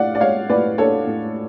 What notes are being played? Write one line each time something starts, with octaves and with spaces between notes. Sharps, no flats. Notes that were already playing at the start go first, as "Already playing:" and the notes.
Already playing: A2 D4 D5 F5 F#5
D5
G#3 C#5 F5
A2 B4 D5
D4 A4 C#5
A2